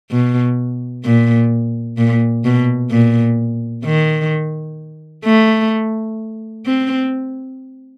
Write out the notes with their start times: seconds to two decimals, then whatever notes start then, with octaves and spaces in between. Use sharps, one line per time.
0.11 B2
1.04 A#2
1.98 A#2
2.45 B2
2.91 A#2
3.85 D#3
5.25 A3
6.66 C4